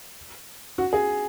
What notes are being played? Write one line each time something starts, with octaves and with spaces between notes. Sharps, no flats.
F#4
G#4